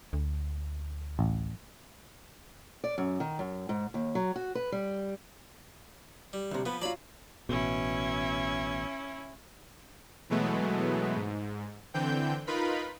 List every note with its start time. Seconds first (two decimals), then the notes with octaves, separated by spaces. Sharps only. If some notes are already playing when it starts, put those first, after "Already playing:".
0.13 D2
1.19 A1
2.84 D5
2.98 F#2
3.20 D#3
3.39 F#2
3.69 G#2
3.94 D#2
4.15 F#3
4.36 F#4
4.55 B4
4.72 G3
6.33 G3
6.51 D2 C3
6.66 F3 B3 B4
6.81 F#3 F4 D5 B5
7.49 A1 B2 C#4 E4
10.30 B2 E3 F#3 G#3 A3 B3
11.16 G#2
11.94 D3 E3 C4 G5 G6
12.47 D#4 F4 A#4 B4 B5